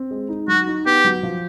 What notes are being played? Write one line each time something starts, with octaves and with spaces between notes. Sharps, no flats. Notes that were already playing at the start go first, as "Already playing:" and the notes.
Already playing: C4
G#3
D#4
F#3 F#4
D#4
B3 G4
F#3
F3